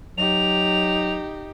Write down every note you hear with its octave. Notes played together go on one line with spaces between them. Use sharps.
F#3 D#4 G4 F7